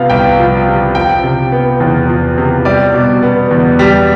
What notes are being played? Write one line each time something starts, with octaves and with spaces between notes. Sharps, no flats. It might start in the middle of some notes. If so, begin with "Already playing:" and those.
Already playing: C3 F3 B3 F5
C2 G5
F3
C3
F3 G5
C3
B3
E2
F3
C3
G3 D5
B2
B3
E2
G3